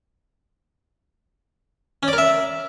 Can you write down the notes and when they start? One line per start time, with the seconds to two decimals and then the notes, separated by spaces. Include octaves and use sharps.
2.03 C#4
2.08 D5
2.13 A#4
2.18 E5